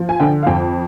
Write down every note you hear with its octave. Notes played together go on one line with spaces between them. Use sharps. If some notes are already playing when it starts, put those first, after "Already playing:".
Already playing: F3
G#5
D3 G5
F5
F2 G5